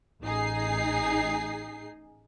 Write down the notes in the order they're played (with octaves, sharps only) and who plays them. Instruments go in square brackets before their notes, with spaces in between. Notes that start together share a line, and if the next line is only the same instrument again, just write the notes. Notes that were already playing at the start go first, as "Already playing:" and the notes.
[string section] A1 D#4 G#4 C7